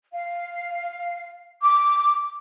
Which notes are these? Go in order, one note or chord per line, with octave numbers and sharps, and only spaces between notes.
F5
D6